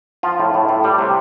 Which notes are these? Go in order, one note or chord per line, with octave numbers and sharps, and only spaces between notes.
F3 F4
A2
A2
A2
G3
C3